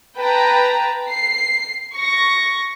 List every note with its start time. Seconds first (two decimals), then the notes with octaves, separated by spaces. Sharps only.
0.17 B4 G5 A5 A#5
1.10 C7
1.94 C#6 A#6